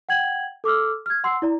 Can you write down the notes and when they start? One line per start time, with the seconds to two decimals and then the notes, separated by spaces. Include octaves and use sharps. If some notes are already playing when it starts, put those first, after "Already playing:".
0.09 F#5 G5 G#6 F#7
0.64 A4 D6 E6 F6
1.06 F6 G#6
1.24 F#5 C6 E6 C7
1.42 E4 D5 A#5